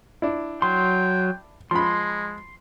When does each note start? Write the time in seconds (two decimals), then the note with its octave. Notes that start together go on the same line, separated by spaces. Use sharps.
0.22 D4 E4
0.62 F#3 G5 C6
1.71 F3 G#3 B5 C6